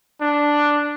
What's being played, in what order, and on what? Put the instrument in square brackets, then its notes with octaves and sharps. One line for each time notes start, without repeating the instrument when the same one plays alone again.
[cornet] D4